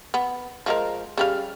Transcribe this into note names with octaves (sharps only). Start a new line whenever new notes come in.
B3
F3 G#3 A#4
C#3 G3 F5